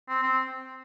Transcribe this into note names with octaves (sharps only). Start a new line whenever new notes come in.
C4
C4